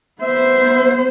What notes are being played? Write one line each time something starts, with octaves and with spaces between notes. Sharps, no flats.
B3 C5 E5